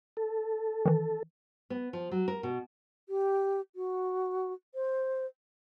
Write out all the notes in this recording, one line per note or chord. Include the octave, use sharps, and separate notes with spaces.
A4
D#3 E3
B3
F3
F#3
A#4
B2
G4
F#4
C5